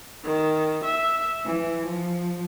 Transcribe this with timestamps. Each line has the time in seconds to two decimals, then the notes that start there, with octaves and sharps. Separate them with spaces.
0.23 D#3
0.85 E5
1.45 E3
1.87 F3